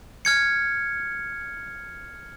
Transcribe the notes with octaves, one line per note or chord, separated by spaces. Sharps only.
F6 G#6 C#7